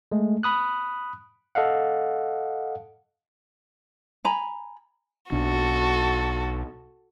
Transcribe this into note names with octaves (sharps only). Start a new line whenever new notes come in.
G#3 A3
B5 D#6 F#6
A4 D#5 F5 F#5
G#5 A#5 B5
B1 D4 F#4 A4